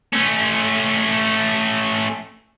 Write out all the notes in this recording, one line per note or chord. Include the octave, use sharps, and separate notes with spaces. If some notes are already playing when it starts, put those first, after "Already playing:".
A3 C#4